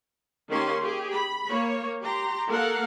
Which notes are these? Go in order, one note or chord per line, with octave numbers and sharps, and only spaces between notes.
D#3 A#3 C#4 G4 C6
G4 G#4
B5
A#3 C#5
G4 A#5 C6
A#3 A4 A#4 F5 F#5